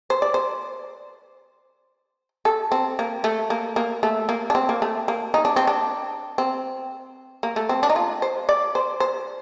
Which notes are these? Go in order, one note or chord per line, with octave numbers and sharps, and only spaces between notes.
C5
D5
C5
A4
C4
A#3
A3
A#3
A#3
A3
A#3
D4
C4
A#3
A3
A#3
D#4
D4
C4
D4
C4
A#3
A3
C4
D4
D#4
F4
C5
D5
C5
C5